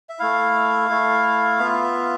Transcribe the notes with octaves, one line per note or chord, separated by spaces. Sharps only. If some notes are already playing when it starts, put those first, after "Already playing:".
E5
A3 E4 F5
A3 E4
B3 F4 E5